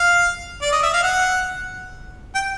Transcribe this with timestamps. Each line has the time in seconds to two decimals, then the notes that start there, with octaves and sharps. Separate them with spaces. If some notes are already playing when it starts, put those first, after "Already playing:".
Already playing: F5
0.62 D5
0.72 D#5
0.83 E5
0.93 F5
1.03 F#5
2.35 G5